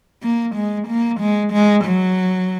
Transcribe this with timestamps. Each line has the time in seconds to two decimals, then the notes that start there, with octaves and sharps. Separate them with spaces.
0.22 A#3
0.55 G#3
0.88 A#3
1.20 G#3
1.53 G#3
1.85 F#3